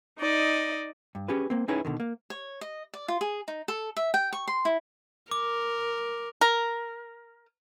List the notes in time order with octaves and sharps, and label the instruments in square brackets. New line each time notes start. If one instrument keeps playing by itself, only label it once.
[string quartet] D#4 D5 D#5
[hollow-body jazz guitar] G2
C#4 G4 G#4 B4
A#3 C4
C#4 D#4 E4 G#4 B4 C#5
B2 D3 D#3
A#3
[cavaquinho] C#5
D#5
D5
F4
G#4
D#4
A4
E5
G5
C#6
C6
E4
[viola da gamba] A#4 [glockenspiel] D6
[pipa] A#4